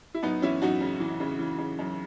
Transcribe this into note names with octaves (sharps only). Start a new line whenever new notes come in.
E4
F#2 B3 D#4
E3 C#4 E4
F#2 D#4 F#4
C#3
E3
C#3
E3
C#3
F#2